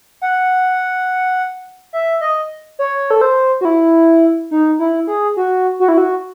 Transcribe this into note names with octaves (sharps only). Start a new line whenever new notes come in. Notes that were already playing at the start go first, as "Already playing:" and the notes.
F#5
E5
D#5
C#5
A4
C5
F#4
E4
D#4
E4
G#4
F#4
F#4
E4
F#4